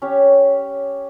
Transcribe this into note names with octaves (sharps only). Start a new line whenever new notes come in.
C#4 G4 C#5